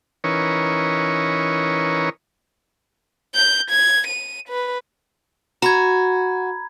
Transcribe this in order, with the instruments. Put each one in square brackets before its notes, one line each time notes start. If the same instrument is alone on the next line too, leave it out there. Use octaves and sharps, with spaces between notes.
[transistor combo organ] E3 C#4 D#4 A#4 B4 C#5
[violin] G6
G#6
D#7
B4
[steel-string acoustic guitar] F#4 [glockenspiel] A#5 B5 G#6